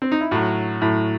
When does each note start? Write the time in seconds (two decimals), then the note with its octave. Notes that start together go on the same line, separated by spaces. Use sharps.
0.02 C4
0.12 D#4
0.21 E4
0.31 A2 F#3 F#4
0.81 A2 F#3